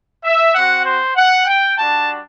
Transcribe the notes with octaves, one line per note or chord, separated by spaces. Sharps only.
E5
C4 F#4 F#5
C5
F#5
G5
G3 D4 F#4 A5